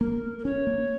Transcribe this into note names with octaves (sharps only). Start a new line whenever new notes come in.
A#3 A#4
A#4
C#4 C#5
A#3